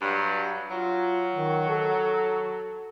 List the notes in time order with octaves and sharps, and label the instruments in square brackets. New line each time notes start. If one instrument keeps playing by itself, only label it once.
[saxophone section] G2 F#3
[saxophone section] F#3 [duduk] F4
[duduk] D#3
A4